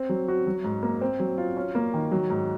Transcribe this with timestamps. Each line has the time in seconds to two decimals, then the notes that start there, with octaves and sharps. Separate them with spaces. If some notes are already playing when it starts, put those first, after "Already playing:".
Already playing: C4
0.09 F#3
0.28 F#4
0.47 F#3
0.64 G#2
0.83 A#3
1.01 C4
1.20 F#3
1.38 F4
1.57 C#4
1.75 A#3
1.94 D#3
2.11 F#3
2.30 G#2